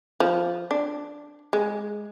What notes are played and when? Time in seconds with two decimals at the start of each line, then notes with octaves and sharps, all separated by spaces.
0.20 F3
0.71 D4
1.53 G#3